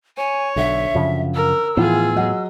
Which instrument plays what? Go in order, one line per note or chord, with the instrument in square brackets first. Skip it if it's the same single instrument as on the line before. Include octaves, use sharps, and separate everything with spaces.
[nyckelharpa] C#5 [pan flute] G#5
[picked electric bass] B1 [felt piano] D3 [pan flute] E5
[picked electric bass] F#2 C#3 F3
[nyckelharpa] A#4 [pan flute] E6
[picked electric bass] A2 B3 [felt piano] E3 F3 [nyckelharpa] F4 G#4
[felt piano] F#3 D#5 F#5